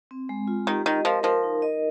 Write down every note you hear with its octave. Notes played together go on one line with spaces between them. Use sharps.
C4
G#3
F4
D#3 G4
D#3 D#5
F3 A#4
F3 A#4
D#4
D#5